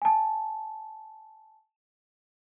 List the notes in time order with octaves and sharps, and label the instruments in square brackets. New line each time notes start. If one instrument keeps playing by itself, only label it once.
[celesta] G#5 A5